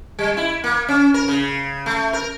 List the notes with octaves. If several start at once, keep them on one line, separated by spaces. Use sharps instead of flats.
G3
E4
A#3
C#4
A#4
C#3
A3
A#4